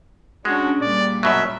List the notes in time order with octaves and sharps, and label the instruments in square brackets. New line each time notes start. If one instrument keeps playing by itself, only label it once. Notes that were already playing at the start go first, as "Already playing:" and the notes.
[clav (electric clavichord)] G#3 [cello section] C#4 D4 [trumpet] F#4
[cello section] A#2 G3 [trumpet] D5
[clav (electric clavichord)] F#2 B2 F#3 [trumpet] E5